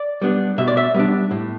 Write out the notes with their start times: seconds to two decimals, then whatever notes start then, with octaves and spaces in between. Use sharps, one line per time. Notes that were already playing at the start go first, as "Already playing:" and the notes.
Already playing: D5
0.22 G3 B3 D4
0.58 B2 E5
0.68 D5
0.77 E5
0.95 G3 B3 D4
1.31 A2